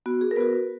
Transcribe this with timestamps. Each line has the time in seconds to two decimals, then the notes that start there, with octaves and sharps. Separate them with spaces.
0.06 B3 F#4
0.21 G#4
0.31 A#4
0.36 B3 F#4 B4